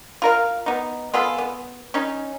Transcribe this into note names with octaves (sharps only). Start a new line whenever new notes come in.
F4 A#4 F5
B3 D#4
B3 F4 G#4 A4
B3
C#4 D#4